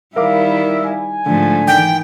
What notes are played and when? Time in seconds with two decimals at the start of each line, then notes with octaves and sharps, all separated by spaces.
0.16 D#3 G3 E4 A#4 E5 F5 D6
0.85 G#5
1.26 G#2 D3 F3 A3
1.67 D#3 E3 G5